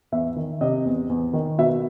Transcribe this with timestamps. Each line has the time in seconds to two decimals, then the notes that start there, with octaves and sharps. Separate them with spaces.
0.12 E2 E5
0.36 D#3
0.61 C3 D#5
0.85 E2
1.09 E2
1.33 D#3
1.58 B2 E5